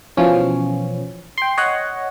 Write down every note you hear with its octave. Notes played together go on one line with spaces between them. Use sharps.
B2 E3 F3 C#4
G5 C6
C#5 D#5 F#5